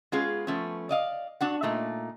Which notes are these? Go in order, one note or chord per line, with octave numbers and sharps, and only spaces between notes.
G#3 B3 C#4 F4 G#4
F3 A3 B3 C#4
D5 D#5 F5
D4 F#4 F#5
A#2 A3 D#4